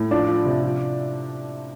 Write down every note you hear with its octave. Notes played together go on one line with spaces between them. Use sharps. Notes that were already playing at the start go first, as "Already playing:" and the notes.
Already playing: A2
F3 D4 D5
F3
C3
F3